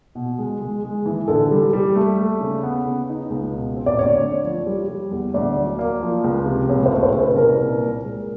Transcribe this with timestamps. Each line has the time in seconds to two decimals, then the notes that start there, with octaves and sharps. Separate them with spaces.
0.15 B2
0.38 G#3
0.61 G#3
0.84 G#3
1.06 E3
1.28 D3 A4
1.51 G3
1.73 G3
1.95 A3
2.19 A3
2.41 C#3
2.63 B3
2.86 C#3
3.09 D#4
3.30 C#2
3.53 B2
3.76 C4
3.86 D5
3.99 D2 C#5
4.22 D2
4.43 F3
4.67 G3
4.88 G3
5.11 E2
5.34 D2 D5
5.56 F#3
5.79 A#3
6.01 F3
6.24 C#2
6.46 C3
6.69 C#2 C#5
6.86 C5
6.92 A3
7.03 C5
7.14 C#3
7.20 B4
7.36 C2 A#4
7.60 A#2
7.82 A#2
8.04 G#3